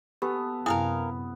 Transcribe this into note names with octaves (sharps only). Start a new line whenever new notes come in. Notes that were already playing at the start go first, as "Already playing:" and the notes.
B3 G4 A4
F#2 C3 E4 A#4 F5 G5 G#5 D#6